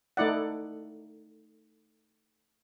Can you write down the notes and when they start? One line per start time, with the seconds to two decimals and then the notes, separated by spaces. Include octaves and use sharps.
0.17 A3 D#4 E4 D5 F#5